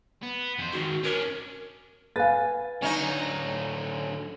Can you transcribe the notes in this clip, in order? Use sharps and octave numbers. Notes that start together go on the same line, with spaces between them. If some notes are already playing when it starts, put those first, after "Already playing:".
B3
F2 C5
G#2 D#3 F#4
C#4 D4 A#4
B4 F5 G#5 A6
D3 F#3 C#4 D#4